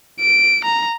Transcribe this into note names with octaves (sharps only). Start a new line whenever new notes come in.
D7
A#5